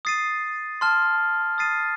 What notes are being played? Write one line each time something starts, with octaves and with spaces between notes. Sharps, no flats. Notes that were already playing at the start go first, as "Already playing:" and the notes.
D#6 A6 C7 D#7
A5 C6 F6
D#6 A6 C7 D#7